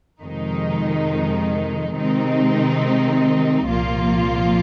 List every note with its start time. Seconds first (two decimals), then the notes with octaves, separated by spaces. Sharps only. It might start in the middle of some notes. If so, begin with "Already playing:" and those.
0.23 F2 C3 D#3 G#3 D#4
1.96 C3 D#3 G#3 C4 D#4
3.68 C2 A#2 F3 A#3 F4